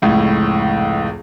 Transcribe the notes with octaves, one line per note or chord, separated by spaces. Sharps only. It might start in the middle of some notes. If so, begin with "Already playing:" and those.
F1 C#2 A2